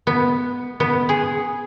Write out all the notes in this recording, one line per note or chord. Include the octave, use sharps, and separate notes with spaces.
B3
B3
G#4